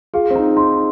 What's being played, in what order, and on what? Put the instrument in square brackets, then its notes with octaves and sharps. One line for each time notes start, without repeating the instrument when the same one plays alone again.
[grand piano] F4 [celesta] G#4
[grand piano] C4
D#4
[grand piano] D#4 [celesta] C6